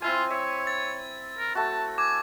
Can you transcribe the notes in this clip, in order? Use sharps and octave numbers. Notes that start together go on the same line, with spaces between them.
C4 E4 F4 G#5
C#5 E5
A6
A#4
A3 F#4 A5
G#5 D6